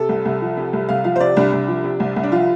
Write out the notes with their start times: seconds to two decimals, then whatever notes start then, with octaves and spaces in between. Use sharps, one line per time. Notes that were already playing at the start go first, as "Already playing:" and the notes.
Already playing: C3 A4
0.09 C2
0.25 C2
0.42 F3
0.57 C3
0.73 C2
0.89 C2 F5
1.04 F3 F5
1.16 C5
1.20 C3 D5
1.37 C2 D4
1.53 C2
1.68 F3
1.84 C3
2.00 C2
2.16 C2
2.23 D4
2.32 F3 F4